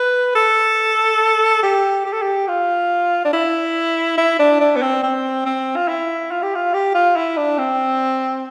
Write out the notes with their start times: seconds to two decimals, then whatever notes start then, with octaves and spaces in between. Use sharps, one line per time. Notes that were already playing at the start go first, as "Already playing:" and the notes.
Already playing: B4
0.35 A4
1.63 G4
2.05 G4
2.13 A4
2.22 G4
2.48 F4
3.25 D4
3.33 E4
4.18 E4
4.39 D4
4.61 D4
4.76 B3
4.82 C4
5.03 C4
5.46 C4
5.76 F4
5.88 E4
6.31 F4
6.43 G4
6.55 F4
6.74 G4
6.95 F4
7.16 E4
7.37 D4
7.58 C4